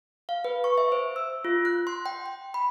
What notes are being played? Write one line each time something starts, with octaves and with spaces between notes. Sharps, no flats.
F5
B4
C#6
E5
C5
E6
F4
F#6
C6
G5
G5
B5